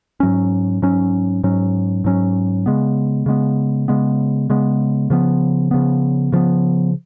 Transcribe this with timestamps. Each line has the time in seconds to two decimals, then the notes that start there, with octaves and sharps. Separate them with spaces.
0.20 G#2 F#3 C#4
0.82 G#2 F#3 C#4
1.44 G#2 F#3 C#4
2.04 G#2 F#3 C#4
2.66 C#3 G#3 B3
3.26 C#3 G#3 B3
3.88 C#3 G#3 B3
4.50 C#3 G#3 B3
5.10 C#3 F3 B3
5.71 C#3 F3 B3
6.32 C#3 F3 B3